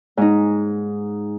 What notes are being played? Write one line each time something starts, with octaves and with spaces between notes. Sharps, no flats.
G#2 D#4